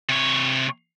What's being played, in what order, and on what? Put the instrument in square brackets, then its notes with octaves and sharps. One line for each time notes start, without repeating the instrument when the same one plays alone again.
[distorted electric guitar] C3 C#5